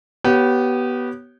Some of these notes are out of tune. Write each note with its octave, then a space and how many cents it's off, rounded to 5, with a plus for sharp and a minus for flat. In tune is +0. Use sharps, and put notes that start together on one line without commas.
B3 -10 G4 -30 C#5 +0